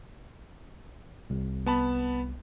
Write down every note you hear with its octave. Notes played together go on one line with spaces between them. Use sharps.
C2
B3 A5 B5